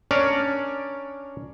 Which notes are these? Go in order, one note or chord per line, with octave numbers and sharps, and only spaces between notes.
C#4 D4 A#4 C#5 D5